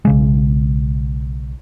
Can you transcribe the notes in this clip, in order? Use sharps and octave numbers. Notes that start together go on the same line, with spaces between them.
B1 C#3 G#3